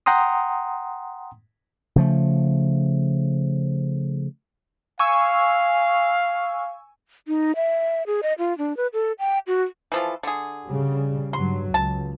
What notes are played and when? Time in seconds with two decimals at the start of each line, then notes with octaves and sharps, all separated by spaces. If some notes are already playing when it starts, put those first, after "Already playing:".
0.06 F#5 G5 A#5 C6 D#6
1.96 C#3 F3 A3
4.99 F5 G#5 C#6 E6
7.28 D#4
7.56 E5
8.07 G#4
8.23 D#5
8.38 F4
8.58 D4
8.77 B4
8.93 A4
9.19 G5
9.47 F#4
9.92 E3 F3 A4
10.23 D3 G#4
10.67 C#3 G3
11.33 G2 F#3 C6
11.74 C#2 A5